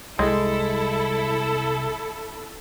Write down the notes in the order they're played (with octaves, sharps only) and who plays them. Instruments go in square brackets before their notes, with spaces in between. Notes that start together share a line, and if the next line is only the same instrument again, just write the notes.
[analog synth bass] C2 [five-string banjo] G#3 [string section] E4 [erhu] A4